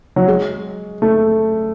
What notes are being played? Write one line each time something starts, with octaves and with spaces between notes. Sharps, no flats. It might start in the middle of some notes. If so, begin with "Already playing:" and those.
F#3
G#3
A3